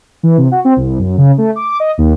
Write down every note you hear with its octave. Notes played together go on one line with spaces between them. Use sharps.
E3
C3
F#4
C4
C2
F#2
C#3
A3
D6
D#5
D#2